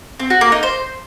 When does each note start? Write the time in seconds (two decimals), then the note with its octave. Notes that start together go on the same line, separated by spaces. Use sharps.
0.20 C4
0.30 F#4
0.41 A#3
0.52 D#4
0.63 C5